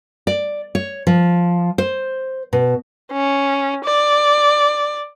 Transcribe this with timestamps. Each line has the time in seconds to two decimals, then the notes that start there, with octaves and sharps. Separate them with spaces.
0.27 D5
0.75 C#5
1.07 F3
1.78 C5
2.53 B2
3.12 C#4
3.84 D5